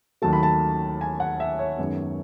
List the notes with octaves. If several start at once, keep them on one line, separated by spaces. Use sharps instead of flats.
D#2 D#3 F#3 A3 A5
B5
A5
G#5
F#5
E5
C#5
F#2 D#3 G#3 B3